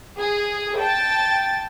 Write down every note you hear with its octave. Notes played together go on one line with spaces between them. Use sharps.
G#4
G5 A5 A6